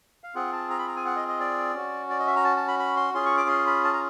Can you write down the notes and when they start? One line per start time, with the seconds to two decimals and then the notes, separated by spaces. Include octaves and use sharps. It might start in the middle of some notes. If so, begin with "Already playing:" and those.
0.24 F5
0.35 C4 F4 G#4 F#5
0.52 A5
0.70 A#5
0.78 B5
0.88 A#5
0.97 G#5
1.06 F#5
1.16 D#5
1.28 D#5
1.40 D5
1.74 C#4 F#4
2.10 D5
2.19 D#5
2.27 E5
2.36 A#5
2.44 A5
2.56 A5
2.68 B5
2.79 B5
2.97 C6
3.14 C#4 F4 G#4 C6
3.26 C#6
3.37 D6
3.49 C6
3.67 B5
3.84 A5
3.93 A#5